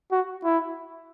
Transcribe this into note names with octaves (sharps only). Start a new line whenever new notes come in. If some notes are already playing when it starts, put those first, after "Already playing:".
F#4
E4